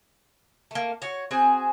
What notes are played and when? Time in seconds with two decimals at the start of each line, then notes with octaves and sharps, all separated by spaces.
0.71 A3 A#3
1.02 F#4 C#5
1.31 C4 F#4 G#4 G#5